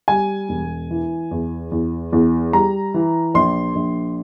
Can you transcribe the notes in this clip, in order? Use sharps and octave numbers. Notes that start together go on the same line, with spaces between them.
G3 G#5
E1
E3
E2
E2
E2
G3 A#5
E3
A#1 C6
A#1